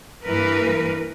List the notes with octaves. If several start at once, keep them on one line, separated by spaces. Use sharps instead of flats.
G2 E3 A#3 A#4 B4